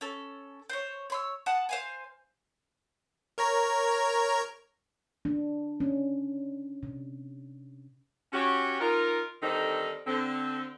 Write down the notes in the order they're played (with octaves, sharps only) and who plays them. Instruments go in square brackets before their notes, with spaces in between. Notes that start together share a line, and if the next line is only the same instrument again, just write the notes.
[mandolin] C#4 A4
C5 C#5
C#5 C6 E6
F#5 A5 D#6
C5 F5 G#5
[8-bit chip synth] A#4 C#5 A#5
[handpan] D4
C#4
C3
[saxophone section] C#4 F#4 G4
D#4 F4 A#4
D3 D#3 G3 C4 D#4 A4
D3 C4